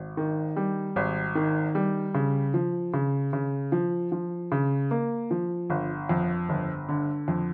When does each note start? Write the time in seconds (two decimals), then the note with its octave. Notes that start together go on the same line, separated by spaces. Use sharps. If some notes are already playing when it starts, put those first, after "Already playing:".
Already playing: G#1
0.17 D#3
0.56 G3
0.96 G#1
1.35 D#3
1.75 G3
2.14 C#3
2.54 F3
2.94 C#3
3.33 C#3
3.72 F3
4.12 F3
4.52 C#3
4.91 A#3
5.31 F3
5.70 G1
6.09 F2
6.49 G1
6.89 D3
7.28 F2